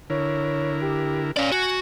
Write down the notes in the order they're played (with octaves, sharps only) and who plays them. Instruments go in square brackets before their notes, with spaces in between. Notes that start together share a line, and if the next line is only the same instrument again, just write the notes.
[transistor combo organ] D3 E4 A#4 [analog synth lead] C#5
[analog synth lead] G4
[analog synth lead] C#4 [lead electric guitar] D5 F5
[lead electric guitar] F#4 [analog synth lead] G#5